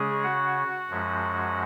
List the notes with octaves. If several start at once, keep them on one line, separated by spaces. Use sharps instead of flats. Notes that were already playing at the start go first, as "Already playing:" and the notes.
Already playing: C#3 G#3 C#4 G#4
F#4 F#5
F#2 F3 G#3 C#4